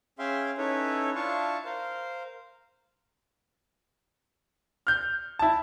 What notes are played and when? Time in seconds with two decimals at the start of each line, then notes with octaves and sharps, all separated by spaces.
0.19 C#4 G#4 E5 F5 G5 C6
0.58 C#4 D#4 E4 A4 B4 C#5
1.15 D4 E4 F4 F5 A5 C#6
1.65 A#4 C5 F5
4.87 F6 G6
5.39 E4 A5